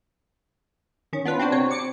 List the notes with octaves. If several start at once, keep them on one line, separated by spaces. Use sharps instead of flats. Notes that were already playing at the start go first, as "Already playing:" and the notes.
D#3 C#4
B3 D4 F4 B4
C4 D4 F#4 C5
C3 C4 C#5
D6 C#7